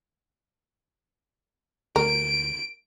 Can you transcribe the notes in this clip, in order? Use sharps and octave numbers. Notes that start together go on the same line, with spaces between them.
D2 A#4 D7